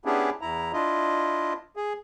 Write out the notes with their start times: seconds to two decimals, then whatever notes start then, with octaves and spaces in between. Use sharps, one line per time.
0.05 B3 C#4 D4 E4 G4 G#4
0.41 E2 E4 A#5
0.73 D4 E4 F4 D#5
1.76 G#4